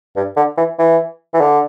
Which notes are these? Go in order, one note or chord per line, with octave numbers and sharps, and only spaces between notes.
G2
D3
E3
E3
E3
D3